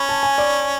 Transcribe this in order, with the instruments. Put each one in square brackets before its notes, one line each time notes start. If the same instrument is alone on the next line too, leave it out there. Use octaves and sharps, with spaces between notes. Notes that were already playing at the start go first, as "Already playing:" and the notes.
Already playing: [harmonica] C#4 [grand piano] B5 C#6
[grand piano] A5
G#5
D5